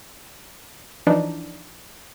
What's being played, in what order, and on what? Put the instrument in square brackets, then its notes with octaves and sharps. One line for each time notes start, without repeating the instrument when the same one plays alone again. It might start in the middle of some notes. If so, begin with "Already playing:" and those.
[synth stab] E3 F3 D4 D#4